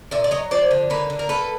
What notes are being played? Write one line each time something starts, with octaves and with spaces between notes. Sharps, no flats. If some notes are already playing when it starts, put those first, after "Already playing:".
A#2 D5 E5
D5
F#3 C#5 D#5
F3 C5 D5
D3
A#3 B4 C#5
D3
A#4
A#3 A4 B4